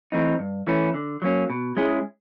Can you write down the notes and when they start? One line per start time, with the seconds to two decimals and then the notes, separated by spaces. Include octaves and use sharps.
0.12 E3 A3 C4 D#4
0.39 G2
0.67 E3 A3 C#4 E4
0.94 D3
1.22 F#3 A#3 C#4
1.50 B2
1.77 G#3 C#4 E4 G#4